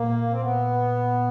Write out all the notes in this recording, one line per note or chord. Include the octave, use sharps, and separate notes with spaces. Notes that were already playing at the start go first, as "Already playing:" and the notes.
Already playing: A#2 A#3
C4
B3